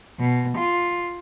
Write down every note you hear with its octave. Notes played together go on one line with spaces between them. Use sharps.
B2
F4